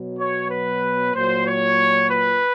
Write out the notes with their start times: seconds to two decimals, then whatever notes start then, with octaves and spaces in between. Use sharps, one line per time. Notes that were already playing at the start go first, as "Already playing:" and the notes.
Already playing: B2 F#3
0.19 C#5
0.51 B4
1.14 A#2 F#3 C5
1.46 C#5
2.09 B4